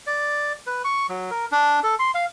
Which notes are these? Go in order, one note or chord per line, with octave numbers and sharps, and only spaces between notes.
D5
B4
C#6
F#3
A#4
D4
A4
C6
F5